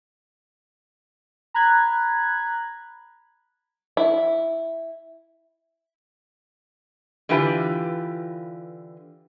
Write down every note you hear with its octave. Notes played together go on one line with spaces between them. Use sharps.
A#5 B5 F#6 G#6
E4
D3 E3 F4 G4 B4